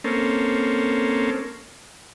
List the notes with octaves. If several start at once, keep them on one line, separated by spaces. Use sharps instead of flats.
A#3 C4 C#4 A4